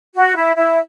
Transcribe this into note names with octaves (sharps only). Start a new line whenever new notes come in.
F#4
E4
E4